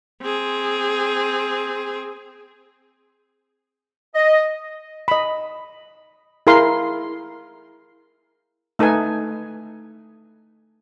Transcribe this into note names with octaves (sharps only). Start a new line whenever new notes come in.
C4 G#4
D#5
D#5 B5
E4 G#4 A#4 F5 C6
A3 D#4 A4 B4 G#5